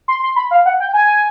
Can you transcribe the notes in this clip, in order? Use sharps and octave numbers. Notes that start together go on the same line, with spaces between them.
C6
C6
B5
F5
F#5
G5
G#5